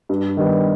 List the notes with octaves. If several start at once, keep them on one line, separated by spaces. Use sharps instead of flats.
G2
D#3 G3 B3